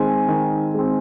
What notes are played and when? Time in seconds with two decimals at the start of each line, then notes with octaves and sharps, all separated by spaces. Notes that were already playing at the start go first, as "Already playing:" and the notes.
Already playing: D#3 G#3 C4 G#5
0.28 D#3
0.74 G#3 C4